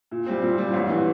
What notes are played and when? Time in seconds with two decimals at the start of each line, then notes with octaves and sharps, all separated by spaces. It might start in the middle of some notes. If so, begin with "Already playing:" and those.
0.11 A#2
0.26 G3 C4
0.42 A#2
0.58 G3 C4
0.73 A1
0.90 E3